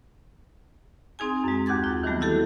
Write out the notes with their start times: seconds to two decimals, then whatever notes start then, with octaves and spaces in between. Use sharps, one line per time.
1.19 C4 D#4 G#4 G#5
1.44 F#2 G#3
1.66 D#2 G4 F#5 D6 G#6 A6
1.84 F4
2.04 D#3 E3 F#3 G3 A3 B3
2.20 E4 F#4 G4 A4